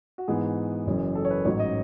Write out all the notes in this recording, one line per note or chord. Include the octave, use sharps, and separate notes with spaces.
F#4
G#2 E3 B3 G#4
F#1 F#2 E3
A4
C#5
B4
A1 G#2 F#3 C#5
D#5